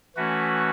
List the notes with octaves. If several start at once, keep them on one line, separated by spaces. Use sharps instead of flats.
E3 A3 C#4 F#4 B4